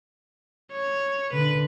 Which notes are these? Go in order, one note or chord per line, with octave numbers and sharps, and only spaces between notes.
C#5
A#2 D3 B4